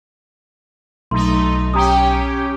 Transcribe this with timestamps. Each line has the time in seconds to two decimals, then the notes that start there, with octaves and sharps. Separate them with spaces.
1.11 B1 A3 D#4 C6
1.74 C#4 G4 G5 A#5 D#6